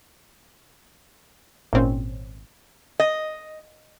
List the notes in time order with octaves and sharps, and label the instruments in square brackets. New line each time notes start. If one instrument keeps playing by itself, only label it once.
[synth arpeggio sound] G#1 A#2 C4 C#4
[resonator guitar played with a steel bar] D#5